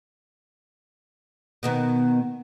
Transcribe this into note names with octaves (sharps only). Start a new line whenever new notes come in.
B2 D#3 B3